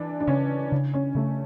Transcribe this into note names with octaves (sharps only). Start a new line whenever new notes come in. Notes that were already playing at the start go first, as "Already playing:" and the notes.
Already playing: E3 D4
D4
C#3 C#4
C#3
C#4
C#3 A3